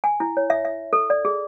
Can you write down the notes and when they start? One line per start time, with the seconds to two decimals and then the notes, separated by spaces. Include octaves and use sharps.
0.04 G#5
0.20 E4
0.37 C#5
0.50 E5
0.65 E5
0.93 A4
1.10 D5
1.25 G#4